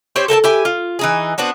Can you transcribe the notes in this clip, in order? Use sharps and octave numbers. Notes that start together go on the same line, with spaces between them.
C4 G4 C5 C#5
A4 A#4 G5 A5
E4 G4 G#5
F4
E3 D#4 G#4
B3 C4 D4 F#4